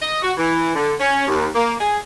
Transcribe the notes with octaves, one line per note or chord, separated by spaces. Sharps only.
D#5
F#4
E3
D3
C#4
D#2
A#3
G#4